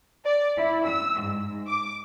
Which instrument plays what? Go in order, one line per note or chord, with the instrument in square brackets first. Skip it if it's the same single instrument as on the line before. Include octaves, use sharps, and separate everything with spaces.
[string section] D5
E4
E6
G#2
D6